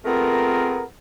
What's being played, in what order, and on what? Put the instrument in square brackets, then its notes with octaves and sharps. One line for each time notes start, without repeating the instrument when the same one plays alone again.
[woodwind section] A3 B3 C4 F4 G#4 A#4